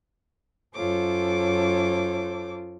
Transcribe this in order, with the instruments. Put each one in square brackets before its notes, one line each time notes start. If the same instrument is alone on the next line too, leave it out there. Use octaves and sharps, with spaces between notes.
[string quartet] F#2 F4 A4 C5 C#5 D6